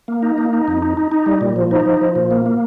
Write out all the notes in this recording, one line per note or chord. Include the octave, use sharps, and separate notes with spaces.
A#3
D#4
A#3
D#4
F2
D#4
D#4
D#4
G3
A#2
F3
D#4
F3
F3
A#2
A#3
A#3